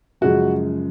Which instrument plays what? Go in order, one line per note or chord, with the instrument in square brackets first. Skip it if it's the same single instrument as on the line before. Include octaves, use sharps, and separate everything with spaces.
[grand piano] F#2 C#3 F3 G#3 F#4